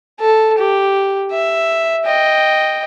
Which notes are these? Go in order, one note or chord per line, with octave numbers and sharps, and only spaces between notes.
A4
G4
E5
D#5 G5